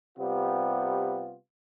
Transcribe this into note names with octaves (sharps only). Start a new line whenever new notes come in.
C3 G3 B3 F4